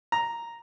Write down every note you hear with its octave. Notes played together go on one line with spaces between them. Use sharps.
A#5